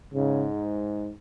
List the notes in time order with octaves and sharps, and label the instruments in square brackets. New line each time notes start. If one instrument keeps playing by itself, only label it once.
[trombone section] G#2 [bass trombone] C#3